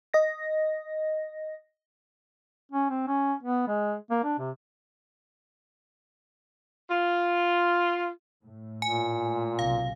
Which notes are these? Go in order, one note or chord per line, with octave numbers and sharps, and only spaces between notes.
D#5 A#6
C#4
C4
C#4
B3
G#3
A#3
D4
C3
F4
A2
A#2 G#5
B1 C3 F5